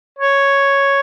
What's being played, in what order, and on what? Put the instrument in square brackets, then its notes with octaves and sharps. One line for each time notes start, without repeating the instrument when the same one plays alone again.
[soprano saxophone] C#5